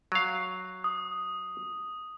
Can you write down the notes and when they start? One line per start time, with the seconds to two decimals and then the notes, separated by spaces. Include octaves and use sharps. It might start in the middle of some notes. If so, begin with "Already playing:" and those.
0.12 F#3 F5
0.84 D#6